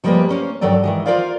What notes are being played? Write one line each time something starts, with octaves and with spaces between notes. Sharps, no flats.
F3 G3 G#3 A#3 A#4 B4
A#3 C#4 C5
G2 D#3 F#3 A4 D5
D#3 E3 G#3
F4 F#4 A#4 C5 D5 F5